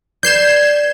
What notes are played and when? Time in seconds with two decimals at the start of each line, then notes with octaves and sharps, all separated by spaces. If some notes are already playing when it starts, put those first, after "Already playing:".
0.23 B4 D5 G6 G#6 C7 E7